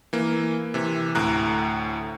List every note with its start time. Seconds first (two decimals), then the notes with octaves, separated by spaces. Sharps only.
0.13 E3 A#3
0.74 C3 E3
1.15 D2 A2 A#5 F#6